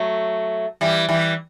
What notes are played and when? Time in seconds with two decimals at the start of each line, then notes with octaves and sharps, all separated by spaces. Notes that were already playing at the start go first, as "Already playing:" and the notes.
Already playing: F#3 A3
0.81 E3 G3
1.09 E3 G3